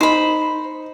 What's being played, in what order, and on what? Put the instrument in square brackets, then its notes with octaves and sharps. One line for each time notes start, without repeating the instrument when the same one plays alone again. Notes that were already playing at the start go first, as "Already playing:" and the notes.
[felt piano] D#4 [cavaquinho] C5 B5